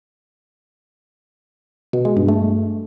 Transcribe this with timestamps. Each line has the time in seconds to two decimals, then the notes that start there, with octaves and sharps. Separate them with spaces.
1.93 B2
2.05 G#3
2.17 G2
2.28 A3